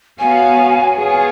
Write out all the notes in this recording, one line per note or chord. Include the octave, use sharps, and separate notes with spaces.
B3 F#4 C#5 F5 G#5
B3 F4 G#4 C#5 F5